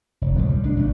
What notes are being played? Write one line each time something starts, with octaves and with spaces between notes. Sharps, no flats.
F1
C2 A2 D3 F#3
G3
B1 G#3 D4
G#1 C#3 A3 D4